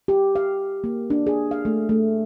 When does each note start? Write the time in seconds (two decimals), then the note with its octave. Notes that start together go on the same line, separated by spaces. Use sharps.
0.08 G4
0.36 F5
0.84 A#3
1.10 D4
1.27 G#4
1.51 F5
1.65 A3
1.89 A3